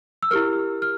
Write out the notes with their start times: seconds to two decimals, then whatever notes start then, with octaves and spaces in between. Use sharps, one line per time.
0.23 E6
0.31 E4 G4 A#4 F6
0.82 F6